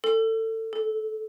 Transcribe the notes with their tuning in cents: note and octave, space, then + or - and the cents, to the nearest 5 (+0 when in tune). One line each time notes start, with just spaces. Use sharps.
A4 +25
A4 -20